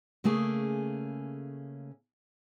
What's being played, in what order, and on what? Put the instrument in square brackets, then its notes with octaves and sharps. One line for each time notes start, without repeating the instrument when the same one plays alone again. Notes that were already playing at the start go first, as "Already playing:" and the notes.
[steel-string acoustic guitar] C#3 A3 A#3 C#4 G#4